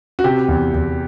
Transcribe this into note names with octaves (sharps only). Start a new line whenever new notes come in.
F#4
C3 G4
E2
E2